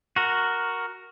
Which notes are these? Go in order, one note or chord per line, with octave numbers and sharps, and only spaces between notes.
F#4 A#4